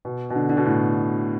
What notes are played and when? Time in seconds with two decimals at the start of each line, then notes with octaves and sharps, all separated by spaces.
0.05 B2
0.30 B2
0.35 D3
0.49 D3
0.57 B2
0.65 A2